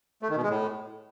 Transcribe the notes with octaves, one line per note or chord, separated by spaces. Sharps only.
A3
D#3
B2
G#3
A2